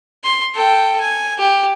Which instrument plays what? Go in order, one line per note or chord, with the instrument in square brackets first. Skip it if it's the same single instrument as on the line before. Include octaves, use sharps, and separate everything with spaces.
[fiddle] C6
A4 G5
G#5
G4